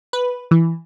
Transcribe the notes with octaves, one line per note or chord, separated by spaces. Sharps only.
B4
E3